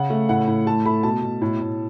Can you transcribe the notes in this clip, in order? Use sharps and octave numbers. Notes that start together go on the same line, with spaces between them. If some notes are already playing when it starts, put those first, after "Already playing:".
Already playing: C#3 F#5
A3
A2 F#5
A2
A3 A5
A3 B5
B2 A5
B2
A2
A2